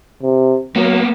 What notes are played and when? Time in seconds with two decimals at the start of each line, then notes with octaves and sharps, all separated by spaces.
0.22 C3
0.76 F#3 A#3 B3